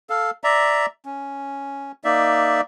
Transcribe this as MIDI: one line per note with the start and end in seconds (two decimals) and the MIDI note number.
0.10 0.31 69
0.10 0.31 77
0.44 0.86 74
0.44 0.86 76
0.44 0.86 82
1.06 1.92 61
2.04 2.61 58
2.04 2.61 63
2.04 2.61 74
2.04 2.61 76